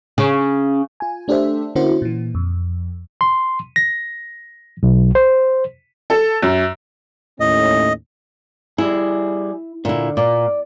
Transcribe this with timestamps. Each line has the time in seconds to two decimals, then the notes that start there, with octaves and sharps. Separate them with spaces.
0.18 C#3
1.00 F4 G#5
1.28 A3 D4 G4 A4 C5 E5
1.75 D3 A#3 C#4 E4 F#4 C5
2.02 A#2 E3
2.35 F2
3.21 C6
3.76 A#6
4.83 B1
5.15 C5
6.10 A4
6.42 F#2
7.40 D#2 A2 C#4 D#5
8.78 G3 E4 G#4
9.85 A#2 D3 E4
10.17 A#2 D5